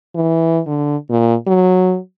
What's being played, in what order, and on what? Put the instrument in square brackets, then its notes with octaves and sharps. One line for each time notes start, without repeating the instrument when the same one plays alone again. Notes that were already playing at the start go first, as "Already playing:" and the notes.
[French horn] E3
D3
A#2
F#3